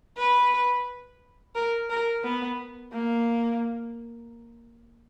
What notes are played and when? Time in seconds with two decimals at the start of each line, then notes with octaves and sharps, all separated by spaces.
0.17 B4
1.55 A#4
1.90 A#4
2.24 B3
2.93 A#3